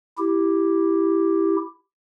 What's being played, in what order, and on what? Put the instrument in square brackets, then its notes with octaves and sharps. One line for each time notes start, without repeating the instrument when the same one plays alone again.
[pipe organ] E4 G4